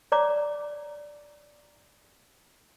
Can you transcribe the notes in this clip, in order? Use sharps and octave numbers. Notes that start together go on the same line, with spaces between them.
C#5 D5 A#5 D6